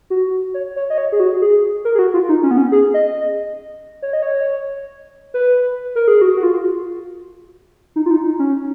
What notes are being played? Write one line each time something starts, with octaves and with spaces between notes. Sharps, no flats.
F#4
C#5
C#5
D#5
C#5
G#4
F#4
G#4
A#4
G#4
F#4
F4
D#4
C#4
B3
C#4
G#4
D#5
C#5
D#5
C#5
B4
A#4
G#4
F#4
F#4
F4
D#4
F4
D#4
D#4
C#4